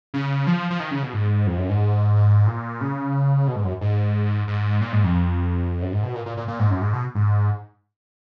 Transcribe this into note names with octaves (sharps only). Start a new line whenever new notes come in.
C#3
F3
F3
D#3
C#3
B2
G#2
F2
F#2
G#2
A#2
C#3
B2
G#2
F#2
G#2
G#2
A#2
G#2
F2
F#2
G#2
B2
A#2
A#2
A#2
A#2
G#2
F#2
G#2
B2
G#2